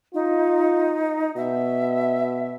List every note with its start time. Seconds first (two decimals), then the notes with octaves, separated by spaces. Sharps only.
0.14 D#4 F4
1.37 B2 E5